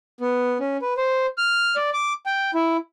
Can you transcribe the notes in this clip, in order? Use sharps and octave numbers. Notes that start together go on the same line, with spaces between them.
B3
C#4
B4
C5
F6
D5
D6
G5
E4